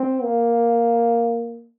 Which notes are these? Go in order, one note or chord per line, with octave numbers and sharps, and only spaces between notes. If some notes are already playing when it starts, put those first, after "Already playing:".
Already playing: C4
A#3